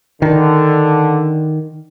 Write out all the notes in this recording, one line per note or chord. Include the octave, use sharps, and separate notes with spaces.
D3 D#3